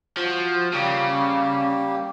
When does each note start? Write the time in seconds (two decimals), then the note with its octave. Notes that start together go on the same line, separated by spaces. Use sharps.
0.17 F3 F#4
0.73 C#3 G3 A#3 G4